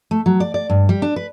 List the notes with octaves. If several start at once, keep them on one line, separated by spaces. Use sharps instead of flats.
A3
F#3
D5
D5
G2
G3
D4
B4